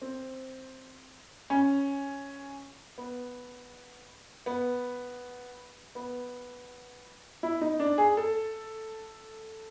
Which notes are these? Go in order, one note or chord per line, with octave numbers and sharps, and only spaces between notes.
C4
C#4
B3
B3
B3
E4
D#4
D4
G#4
A4